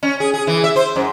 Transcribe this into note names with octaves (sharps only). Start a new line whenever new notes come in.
C#4
G#4
G#4
E3
E5
C5
F#2